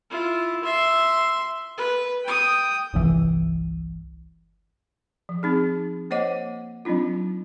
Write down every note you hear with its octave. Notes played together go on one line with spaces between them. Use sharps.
E4 F4
E5 C6
B4
G5 D#6
G1 C2 E3
F3
C4 D#4 G#4
A#3 C5 C#5 D#5 F#5 D6
F#3 C4 D4 D#4 F4